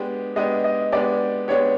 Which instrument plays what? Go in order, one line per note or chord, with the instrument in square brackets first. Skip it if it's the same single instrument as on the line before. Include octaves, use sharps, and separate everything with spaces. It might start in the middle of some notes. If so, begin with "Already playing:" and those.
Already playing: [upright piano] G#3 B3 D4 G4
[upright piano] G#3 B3 D4 G4 [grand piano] D#5
[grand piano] D#5
[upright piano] G#3 B3 D4 G4 [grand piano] D5
[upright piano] G#3 B3 D4 G4 [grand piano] C#5